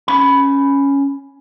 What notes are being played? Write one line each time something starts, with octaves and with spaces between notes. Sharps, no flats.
C#4 B5